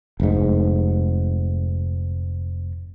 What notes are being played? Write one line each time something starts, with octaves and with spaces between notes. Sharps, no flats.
F1 G#2